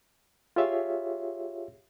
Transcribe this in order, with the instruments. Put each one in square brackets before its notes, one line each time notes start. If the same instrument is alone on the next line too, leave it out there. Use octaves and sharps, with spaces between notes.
[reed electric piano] F4 G4 G#4 C#5 E5 F5